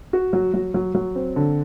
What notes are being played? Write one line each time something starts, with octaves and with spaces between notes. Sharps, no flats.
F#4
F#3
F#3
F#3
F#3
C4
D3